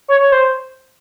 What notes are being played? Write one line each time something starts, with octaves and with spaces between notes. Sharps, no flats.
C#5
C#5
C5